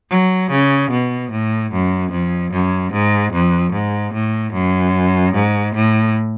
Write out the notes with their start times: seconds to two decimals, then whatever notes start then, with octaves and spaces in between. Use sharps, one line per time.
0.11 F#3
0.51 C#3
0.91 B2
1.31 A2
1.72 F#2
2.11 F2
2.52 F#2
2.93 G#2
3.33 F2
3.73 G#2
4.13 A2
4.53 F#2
5.34 G#2
5.75 A2